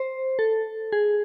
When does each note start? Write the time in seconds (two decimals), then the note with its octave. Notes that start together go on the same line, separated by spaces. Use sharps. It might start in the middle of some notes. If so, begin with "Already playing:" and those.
Already playing: C5
0.39 A4
0.92 G#4